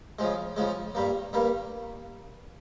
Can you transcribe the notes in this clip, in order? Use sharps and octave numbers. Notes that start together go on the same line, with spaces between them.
C#3 F3 G#3
C#3 F3 G#3
G2 G3 A#3
G2 G3 A#3